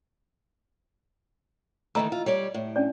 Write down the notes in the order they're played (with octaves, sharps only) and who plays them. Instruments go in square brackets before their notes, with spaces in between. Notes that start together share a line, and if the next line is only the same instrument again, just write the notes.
[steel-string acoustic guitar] D#3 E3 A3 [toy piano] D#5 A#5 E6
[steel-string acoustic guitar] F4
G3 C#5 D5
A2
[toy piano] C#4 D4 D5